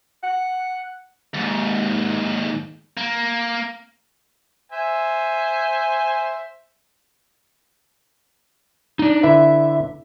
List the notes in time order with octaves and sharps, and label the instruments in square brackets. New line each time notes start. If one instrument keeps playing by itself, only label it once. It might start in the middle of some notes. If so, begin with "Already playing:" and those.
[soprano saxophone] F#5
[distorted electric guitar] D#2 G#2
A#3
[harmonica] C5 E5 G#5
[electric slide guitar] D4 D#4
[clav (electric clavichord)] D3 E4 B4 [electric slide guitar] E5